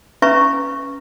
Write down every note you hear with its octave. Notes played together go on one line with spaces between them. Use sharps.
C#4 B4 E5 A#5 C#6